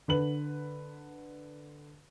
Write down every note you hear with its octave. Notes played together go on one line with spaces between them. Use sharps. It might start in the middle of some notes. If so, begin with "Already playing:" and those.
D3 B4 F#7